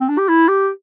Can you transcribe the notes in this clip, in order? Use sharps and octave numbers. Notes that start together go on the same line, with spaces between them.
C4
D4
G4
E4
G4